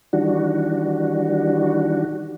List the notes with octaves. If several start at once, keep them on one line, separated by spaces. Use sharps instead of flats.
D#3 E3 G3 D4 F#4